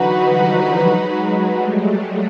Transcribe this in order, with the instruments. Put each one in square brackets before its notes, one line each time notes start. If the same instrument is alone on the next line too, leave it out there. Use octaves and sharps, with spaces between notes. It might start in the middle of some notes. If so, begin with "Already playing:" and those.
Already playing: [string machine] D3 E3 F#3 [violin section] D#4 F#4 B4
[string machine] F3 G3
F#3 G#3
G3 A3